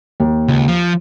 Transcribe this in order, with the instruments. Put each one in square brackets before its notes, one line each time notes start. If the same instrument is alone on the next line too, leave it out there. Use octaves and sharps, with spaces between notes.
[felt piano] D#2
[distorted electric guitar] C#2
F3